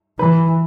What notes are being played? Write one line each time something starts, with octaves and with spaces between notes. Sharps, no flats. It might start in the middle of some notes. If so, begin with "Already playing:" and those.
E3 B4